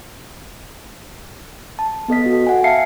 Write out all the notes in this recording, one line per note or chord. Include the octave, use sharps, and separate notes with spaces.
A5
B3 A4 D#5 B6
F#4
F#5 G#5
E5 F5 G#5 A5 C7 C#7